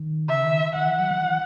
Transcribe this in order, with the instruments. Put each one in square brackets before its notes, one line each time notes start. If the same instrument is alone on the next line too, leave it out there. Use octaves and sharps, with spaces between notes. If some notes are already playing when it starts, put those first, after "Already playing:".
Already playing: [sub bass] D#3
[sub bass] C#3 [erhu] E5
[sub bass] D#3
[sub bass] D#3 [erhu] F#5
[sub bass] E3
F#3
E3
E3